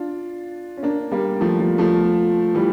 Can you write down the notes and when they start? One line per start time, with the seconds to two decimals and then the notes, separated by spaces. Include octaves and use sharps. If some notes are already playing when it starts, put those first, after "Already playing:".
Already playing: D4 F4
0.77 C#4
0.83 A#3 D4
1.12 G3 A#3
1.41 F3 A3
1.60 F3
1.78 F3 A3
2.55 E3 G3